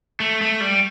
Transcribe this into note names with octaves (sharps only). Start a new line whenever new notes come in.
A3
A3
G3